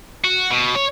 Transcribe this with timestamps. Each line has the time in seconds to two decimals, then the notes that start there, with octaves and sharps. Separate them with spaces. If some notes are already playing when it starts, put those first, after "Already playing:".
0.25 F#4
0.51 B2
0.76 C#5